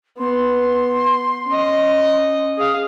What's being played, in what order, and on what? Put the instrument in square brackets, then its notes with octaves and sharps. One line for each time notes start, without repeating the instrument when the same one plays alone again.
[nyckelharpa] B3 [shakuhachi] C6
[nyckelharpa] C#4 D#5
[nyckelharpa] G#4 F5 [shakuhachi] D#6